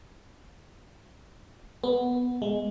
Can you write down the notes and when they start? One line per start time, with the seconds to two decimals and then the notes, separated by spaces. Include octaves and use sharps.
1.84 B3
2.42 G#3